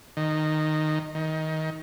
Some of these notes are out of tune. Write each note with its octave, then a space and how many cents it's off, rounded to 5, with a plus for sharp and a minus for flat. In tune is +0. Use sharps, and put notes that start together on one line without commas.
D#3 -10
D#3 +20